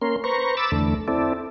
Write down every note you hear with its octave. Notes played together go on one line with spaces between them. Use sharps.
A#3 C#4 A#4 C6
B4 C5 A#5 C#6
B5 D6 E6 A6
E2 D3 A3
C4 E4 A4 D5